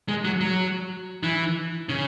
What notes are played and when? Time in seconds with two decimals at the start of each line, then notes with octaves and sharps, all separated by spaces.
0.08 G#3
0.25 F#3
0.41 F#3
1.23 E3
1.89 C#3